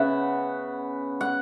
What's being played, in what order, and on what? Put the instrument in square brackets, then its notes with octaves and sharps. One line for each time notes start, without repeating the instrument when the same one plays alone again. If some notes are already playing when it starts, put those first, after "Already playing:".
Already playing: [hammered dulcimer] C#3 B3 E5 F#5
F#5